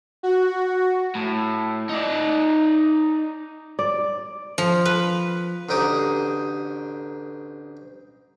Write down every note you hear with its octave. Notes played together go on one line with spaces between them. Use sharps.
F#4
A2
D#4 D5
D5
F3
B4
A1 D2 D#4 G4 D#6